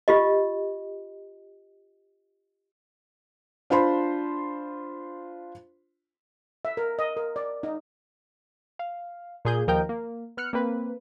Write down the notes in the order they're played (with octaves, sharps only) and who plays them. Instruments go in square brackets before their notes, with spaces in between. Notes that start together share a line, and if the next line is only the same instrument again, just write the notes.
[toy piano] F4 G4 D#5
[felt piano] D4 F4 C5 B5 C6
[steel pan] E5
A#4
D#5
A#4
D5
D#4
[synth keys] F5
A#2 G#4 G6
D#2 F3 A#4 D#5 G5 G6
A#3
B3 F6 F#6 C#7
A#3 C4 B4